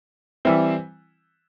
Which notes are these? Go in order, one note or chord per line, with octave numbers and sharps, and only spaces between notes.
E3 G3 C4 E4